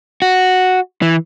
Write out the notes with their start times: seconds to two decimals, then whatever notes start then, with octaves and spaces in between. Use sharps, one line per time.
0.22 F#4
1.02 E3